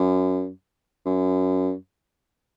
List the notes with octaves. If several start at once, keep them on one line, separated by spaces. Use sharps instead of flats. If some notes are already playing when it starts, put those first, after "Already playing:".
Already playing: F#2
F#2